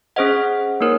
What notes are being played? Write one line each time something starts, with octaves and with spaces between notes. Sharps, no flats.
C#4 G#4 C5 D#5 F#5
A#3 D#4 A#4 C#5